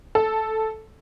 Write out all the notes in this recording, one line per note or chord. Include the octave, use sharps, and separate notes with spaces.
A4